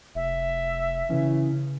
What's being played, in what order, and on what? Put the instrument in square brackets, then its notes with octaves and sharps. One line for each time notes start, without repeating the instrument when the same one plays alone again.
[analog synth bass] F1 [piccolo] E5
[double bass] C#3 [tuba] E3 [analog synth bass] C#4